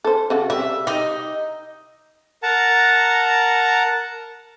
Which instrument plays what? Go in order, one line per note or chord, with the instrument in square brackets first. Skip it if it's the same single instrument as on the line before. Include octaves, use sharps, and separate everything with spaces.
[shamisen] A4 C5
C#3 F#4 A4
[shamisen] G3 C4 [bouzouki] E5
[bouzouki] D#4 D#5 [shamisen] G4
[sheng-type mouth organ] A#4 F#5 A5 A#5